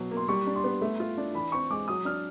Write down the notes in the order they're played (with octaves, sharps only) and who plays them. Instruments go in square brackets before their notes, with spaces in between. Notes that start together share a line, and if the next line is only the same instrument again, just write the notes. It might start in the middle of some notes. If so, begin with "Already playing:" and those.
Already playing: [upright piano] B2 F#3
A#3
[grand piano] C6
[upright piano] G3 [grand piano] C#6
[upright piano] D4
[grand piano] C6
[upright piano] B3
A3
F4
D4
[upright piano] E3 [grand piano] B5
[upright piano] C4 [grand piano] C#6
[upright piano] G#3 [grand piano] D6
[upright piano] F#3 [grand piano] D#6
[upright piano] D4 [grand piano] F6